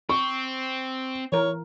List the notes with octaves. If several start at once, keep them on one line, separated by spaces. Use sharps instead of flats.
C4 C#6
E3 A#4 C#5